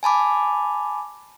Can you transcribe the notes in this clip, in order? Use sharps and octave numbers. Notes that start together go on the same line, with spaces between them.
G#5 A5 B5 D6